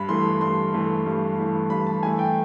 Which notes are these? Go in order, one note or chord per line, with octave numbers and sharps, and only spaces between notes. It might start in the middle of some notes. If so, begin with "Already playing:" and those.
Already playing: G2 B5
E3 A3 C6
G2 C6
E3 A3
G2
E3 A3
G2 B5
A5
E3 A3 G#5
G5